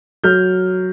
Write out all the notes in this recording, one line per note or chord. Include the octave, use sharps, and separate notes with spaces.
F#3 F6 G6